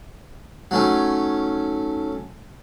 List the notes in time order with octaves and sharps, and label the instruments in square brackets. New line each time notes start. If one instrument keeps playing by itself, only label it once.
[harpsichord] F#3 A3 C#4 [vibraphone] D#4 C#5 A5